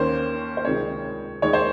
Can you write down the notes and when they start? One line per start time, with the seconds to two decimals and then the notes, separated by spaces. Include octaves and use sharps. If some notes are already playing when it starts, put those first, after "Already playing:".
Already playing: D#2 D#3 A#3 C#4 C5
0.57 C5
0.64 C#2 C3 D#3 G#3 C4 C#5
1.42 D#2 D#3 G#3 C#5
1.53 C5